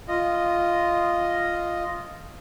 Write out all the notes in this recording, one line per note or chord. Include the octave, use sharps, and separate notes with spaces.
F4 D#5